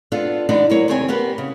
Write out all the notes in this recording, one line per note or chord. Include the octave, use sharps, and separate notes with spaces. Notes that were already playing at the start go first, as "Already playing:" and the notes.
B3 D4 F4 A4
D3 E3 B3 D4 D#4
F#3 A#3 C#5
D#2 C3 C4 C#5 G#5
A#3 B3 G4 B4
C#3